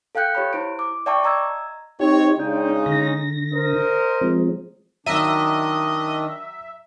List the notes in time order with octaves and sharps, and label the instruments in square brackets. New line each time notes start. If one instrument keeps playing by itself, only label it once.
[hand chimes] A4 F5 G5 F#6 G6 C#7
G4 C#5 B5
E4 C5 D7
D6
D5 E5 G5 A5 C#6 D6
D#5 A#5 E6 G#6
[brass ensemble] C4 C#5 [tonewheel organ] D#4 G4
[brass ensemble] C#3 G#3 D#4 [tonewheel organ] D4 G5
[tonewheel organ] D3 A#6
[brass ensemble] A#4 C5 D#5
[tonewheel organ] F3 G#3 C4
[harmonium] D#3 D4 [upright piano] F#3 [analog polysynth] D#5 [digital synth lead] E5